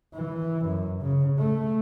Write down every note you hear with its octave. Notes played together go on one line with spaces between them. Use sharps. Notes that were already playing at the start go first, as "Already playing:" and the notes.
E3
F#2
C#3
A3